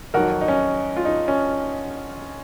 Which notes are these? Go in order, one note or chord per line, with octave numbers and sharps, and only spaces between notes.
F2 D#3 F#3 F#4 A#4
D#4
C#4
F4
D#4
C#4